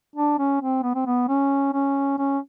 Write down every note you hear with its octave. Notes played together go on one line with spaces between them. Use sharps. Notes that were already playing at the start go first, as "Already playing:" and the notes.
D4
C#4
C4
B3
C4
B3
C#4
C#4
C#4